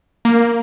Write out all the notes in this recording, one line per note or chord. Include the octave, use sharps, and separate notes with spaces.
A#3